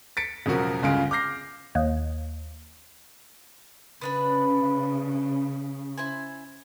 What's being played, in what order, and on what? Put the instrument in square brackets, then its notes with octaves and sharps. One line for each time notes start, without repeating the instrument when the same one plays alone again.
[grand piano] A6 B6 C#7 D7
E1 C#3 F3 F#3 F#4 A#4
G1 C#2 C#3 F4 G#4 D7
D6 F6 G6 A#6 C7
[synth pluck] D#2
[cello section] C#3 [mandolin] B3 D4 B4
[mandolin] E4 C5 G#5